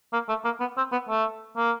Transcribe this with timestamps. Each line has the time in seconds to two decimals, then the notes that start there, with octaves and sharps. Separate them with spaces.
0.13 A#3
0.28 A3
0.45 A#3
0.60 B3
0.77 C4
0.92 B3
1.09 A3
1.57 A#3